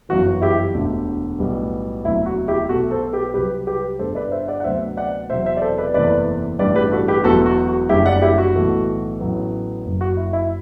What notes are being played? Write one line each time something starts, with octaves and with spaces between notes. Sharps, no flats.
G1 F#2 E3 F#4
E4 G4
E1 D2 D3
B1 A2 G3 B3
E1 D2 C3 F#3 E4
F#4
E4 G4
B1 B2 A3 F#4 A4
A4 C5
G4 B4
C2 C3 F#3 G4 B4
G4 B4
G1 G2 D3 G3 A4 C5
B4 D5
C5 E5
D5 F#5
F#5
D2 C3 F#3 B3 C5 E5
D5 F#5
E1 E2 C3 F#3 C5 E5
C5 E5
D5
A4 C5
B4 D5
F#1 E2 C3 E3 A3 B4 D5
A1 G2 E3 G3 B3 B4 D5
G4 B4
F#4 A4
G4 B4
E1 E2 B2 F#3 A3 F#4 A4
F#4
F#4
F#1 F#2 D3 G3 E4 G4
D5 F#5
E4 G4
F#4
B1 A2 E3 A3
A1 A2 F#3 B3
F#1 F#2 F#3
F#4
E4
E4